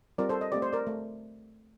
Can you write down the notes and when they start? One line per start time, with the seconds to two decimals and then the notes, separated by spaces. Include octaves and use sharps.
0.18 G3 C4 F4 A#4 D5
0.29 A4 C5
0.41 D#5
0.52 A3 C4 G4 D5
0.62 C5
0.73 A#4 D5
0.87 A3